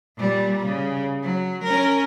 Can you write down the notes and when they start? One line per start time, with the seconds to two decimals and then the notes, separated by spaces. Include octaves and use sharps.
0.18 A#2 G3
0.65 C#3
1.23 F#3
1.64 C#4 A#4